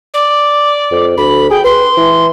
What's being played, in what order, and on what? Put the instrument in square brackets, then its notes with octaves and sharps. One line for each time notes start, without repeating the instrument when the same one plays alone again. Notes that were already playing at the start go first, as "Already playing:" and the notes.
[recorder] D5
[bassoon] F2
[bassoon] D2 [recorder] B5
[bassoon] G#4 [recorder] G5
[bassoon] B4 [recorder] C6
[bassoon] E3